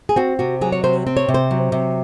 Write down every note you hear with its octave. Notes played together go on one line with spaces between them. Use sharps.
G#4
C4 F#4
C3 F#4
F#3 G#4
C#5
C3 C5
C4
C#5
C3
C5
F#3
C3